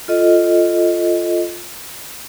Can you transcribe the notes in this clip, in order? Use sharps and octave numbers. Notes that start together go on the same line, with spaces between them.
F4 A4 D#5